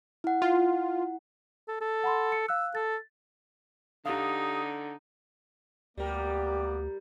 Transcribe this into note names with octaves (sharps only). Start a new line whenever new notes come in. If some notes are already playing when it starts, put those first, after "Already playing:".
E4 F#5
F4
A4
A4
F#5 B5 C6
C#7
F5 E6 F#6
A4 A6
D3 D#4 G4 F5 D#6
D2 G3 A#3 B3 G4 A#4 D5